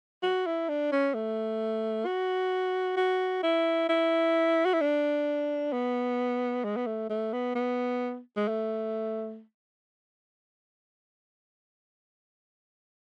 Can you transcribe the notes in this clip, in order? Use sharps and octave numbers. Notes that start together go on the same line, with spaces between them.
F#4
E4
D4
C#4
A3
F#4
F#4
E4
E4
F#4
E4
D4
B3
G#3
B3
A3
A3
B3
B3
G#3
A3